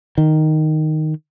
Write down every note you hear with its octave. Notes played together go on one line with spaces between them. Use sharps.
D#3